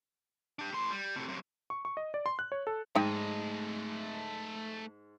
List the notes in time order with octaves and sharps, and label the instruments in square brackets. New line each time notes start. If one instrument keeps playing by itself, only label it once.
[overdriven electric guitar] D4 G4
A2 C6
G3
A2 C3
F#2 C3
[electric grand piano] C#6
C#6
D#5
D5
C6
F#6
C#5
A4
[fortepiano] G#2 [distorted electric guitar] A3 D#5 [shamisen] D#4 G5